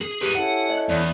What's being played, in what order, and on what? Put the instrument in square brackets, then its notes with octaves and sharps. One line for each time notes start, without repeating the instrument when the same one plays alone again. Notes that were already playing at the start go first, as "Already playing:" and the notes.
[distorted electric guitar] G#4
[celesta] G4 D#7 [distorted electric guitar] G#4 B4
[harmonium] C#4 E4 A4 [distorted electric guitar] F#5
[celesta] D#5
[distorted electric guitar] E2 [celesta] D5